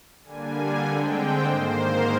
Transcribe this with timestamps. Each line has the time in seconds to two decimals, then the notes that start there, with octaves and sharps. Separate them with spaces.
0.24 D3 G3 A#3 D4 G#5
0.84 D3 G#3 C4 G5
1.14 C5
1.45 G#2 D#3 A#3
1.75 A#4